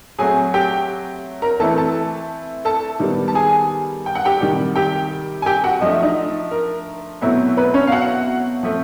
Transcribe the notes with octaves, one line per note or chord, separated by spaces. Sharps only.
F#3 A3 C4 G#4 G#5
G4 G5
A#4 A#5
E3 A3 C4 E4 A4 A5
A4 A5
A4 A5
D#3 G3 B3
A5
G#4 G#5
G5
F#5
G4 G5
C3 D#3 G3
G4 G5
G#5
G4 G5
F#4 F#5
F3 A3 D4 D#5
E5
D#4 D#5
A#4
B2 F#3 A3 C4 E4
B3 B4
C#4 C#5
F5
F#4 F#5
F3 A3 C4